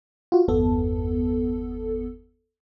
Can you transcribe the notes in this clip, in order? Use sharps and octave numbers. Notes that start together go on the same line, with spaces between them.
F4 F#4
G1 E2 B3 A4